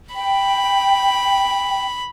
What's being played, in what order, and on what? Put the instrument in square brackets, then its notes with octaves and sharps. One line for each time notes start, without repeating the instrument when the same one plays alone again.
[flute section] G5 [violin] B5